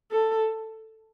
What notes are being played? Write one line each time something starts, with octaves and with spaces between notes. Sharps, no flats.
A4